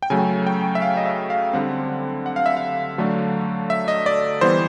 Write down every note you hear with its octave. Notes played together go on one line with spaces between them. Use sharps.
G5
C#3 F#3 A3 G#5
G5
E5
F5
D#5
E5
F5
D3 G3 C4 F#5
F#5
F5
E5
F5
D3 F#3 A3 D4
E5
D#5
D5
E3 G3 B3 C5